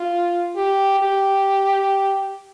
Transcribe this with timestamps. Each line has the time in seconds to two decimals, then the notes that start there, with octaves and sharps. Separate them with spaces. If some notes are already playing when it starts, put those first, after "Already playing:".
Already playing: F4
0.56 G4
0.99 G4